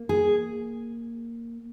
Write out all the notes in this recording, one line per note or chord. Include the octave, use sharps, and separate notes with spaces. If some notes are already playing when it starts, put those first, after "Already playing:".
Already playing: A#3
G#4